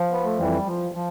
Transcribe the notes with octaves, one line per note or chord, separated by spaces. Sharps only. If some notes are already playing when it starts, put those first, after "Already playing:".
Already playing: F3
B3
A3
F2 E3 G3
F3
F3